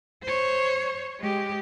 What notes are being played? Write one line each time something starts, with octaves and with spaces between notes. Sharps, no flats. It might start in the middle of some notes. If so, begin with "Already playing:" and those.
C5 C#5
G#3 G4